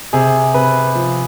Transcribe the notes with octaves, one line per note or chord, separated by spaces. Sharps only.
C3 G#4
C3 B4
F3